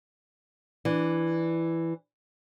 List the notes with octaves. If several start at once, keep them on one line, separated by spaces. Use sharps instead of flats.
E3 D4